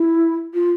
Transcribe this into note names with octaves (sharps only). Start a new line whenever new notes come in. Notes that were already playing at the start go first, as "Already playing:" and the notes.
Already playing: E4
F4